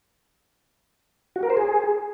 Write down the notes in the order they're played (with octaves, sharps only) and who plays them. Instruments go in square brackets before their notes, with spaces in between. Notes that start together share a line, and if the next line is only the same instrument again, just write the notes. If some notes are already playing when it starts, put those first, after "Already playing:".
[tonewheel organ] F#4
A#4
C5
G#4